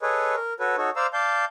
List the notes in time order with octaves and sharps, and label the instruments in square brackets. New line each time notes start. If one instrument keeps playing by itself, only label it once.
[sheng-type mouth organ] G#4 A4 B4 C#5 D#5
A#4
F#4 A4 B4 C#5
D#4 F#4 A4 C#5
C5 D5 F5 A#5 E6
D5 F5 A5 G6